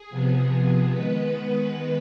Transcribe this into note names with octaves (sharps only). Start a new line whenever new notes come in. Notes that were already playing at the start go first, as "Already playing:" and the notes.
Already playing: G#4
C3 F3 B3
D#3 G#3 B3 B4